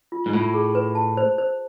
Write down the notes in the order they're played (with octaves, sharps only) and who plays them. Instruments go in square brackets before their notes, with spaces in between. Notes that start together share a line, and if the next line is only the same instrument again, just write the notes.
[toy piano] F4
[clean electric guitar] G#2
[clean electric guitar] A2 [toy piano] F4
[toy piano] G#4
B4
A5
C5
C5